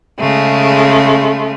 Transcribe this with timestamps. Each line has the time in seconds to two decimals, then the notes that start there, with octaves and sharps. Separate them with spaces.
0.19 C#3 G#3 A3